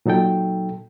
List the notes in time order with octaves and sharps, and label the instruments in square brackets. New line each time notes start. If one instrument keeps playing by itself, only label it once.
[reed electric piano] A#2 F#3 D#4 A4 G5